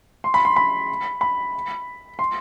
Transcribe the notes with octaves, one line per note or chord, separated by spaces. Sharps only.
C6
B5
C6
B5
B5
C6